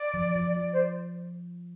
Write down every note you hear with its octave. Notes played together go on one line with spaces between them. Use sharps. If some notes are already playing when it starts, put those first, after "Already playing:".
Already playing: D5
F3
F3
F3
C5